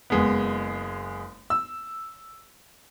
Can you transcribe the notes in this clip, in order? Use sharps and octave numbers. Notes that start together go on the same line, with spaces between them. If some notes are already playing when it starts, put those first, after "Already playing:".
F#1 G#3 B3
E6